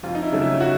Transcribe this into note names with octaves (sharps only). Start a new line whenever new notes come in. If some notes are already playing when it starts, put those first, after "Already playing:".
F2 F4
D#4
E4
C#3 F#3 A3
E4
F#4